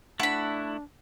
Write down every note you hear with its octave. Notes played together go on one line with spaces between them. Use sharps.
A3 D4 E4 F#5 B5